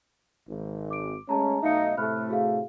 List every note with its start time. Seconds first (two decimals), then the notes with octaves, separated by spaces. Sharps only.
0.48 G#1
0.91 D6 D7
1.29 G#3 A3 C#4 A5 A#5
1.62 B1 A3 D#4 E5 F5 C#7
1.97 A2 C3 A3 B5 F6 F#6
2.28 F#4 G#4 F5